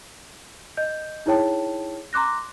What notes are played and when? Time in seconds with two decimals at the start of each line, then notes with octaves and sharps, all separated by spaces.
0.77 D#5 G6
1.26 D#4 E4 G#4 C#5 G5 A5
2.13 A#5 C6 D6 F#6 A#6